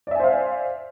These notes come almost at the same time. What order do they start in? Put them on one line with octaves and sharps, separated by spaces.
D5 E5 G#5 C5 F5